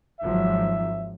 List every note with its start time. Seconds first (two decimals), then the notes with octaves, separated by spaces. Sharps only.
0.20 G#1 F3 F#3 E5